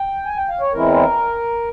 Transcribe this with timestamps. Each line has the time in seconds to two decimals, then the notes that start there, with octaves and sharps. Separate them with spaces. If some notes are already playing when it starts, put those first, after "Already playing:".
Already playing: G5
0.26 G#5
0.37 G5
0.49 F5
0.60 C#5
0.72 E2 E3 G#3 C4 E4 A#4